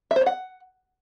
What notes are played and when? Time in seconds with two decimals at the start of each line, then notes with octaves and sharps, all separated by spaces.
0.11 E5
0.16 C5
0.21 C#5
0.26 F#5